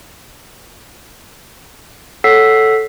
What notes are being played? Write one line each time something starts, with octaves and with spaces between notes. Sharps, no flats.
A4 C#5 F#5 E6 B6 C7